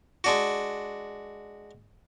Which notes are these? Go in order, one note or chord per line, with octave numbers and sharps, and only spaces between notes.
G#3 D4 F#4